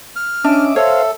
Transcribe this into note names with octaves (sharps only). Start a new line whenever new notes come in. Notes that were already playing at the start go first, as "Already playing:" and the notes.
F6
C#4 D4 D#5 E5 D6
A4 C5 C#5 E5 F5